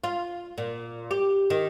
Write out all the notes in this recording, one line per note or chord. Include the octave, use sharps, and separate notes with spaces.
F4
A#2
G4
D#3